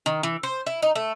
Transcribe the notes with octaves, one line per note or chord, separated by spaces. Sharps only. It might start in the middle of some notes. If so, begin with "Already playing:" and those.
D#3
E3
C5
E4
D#4
A3